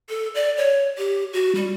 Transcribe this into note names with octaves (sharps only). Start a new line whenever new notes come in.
A4
D5
C#5
G4
F#4
G3